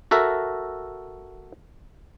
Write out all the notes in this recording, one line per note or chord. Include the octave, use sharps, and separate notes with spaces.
F#4 A4 A#4 E5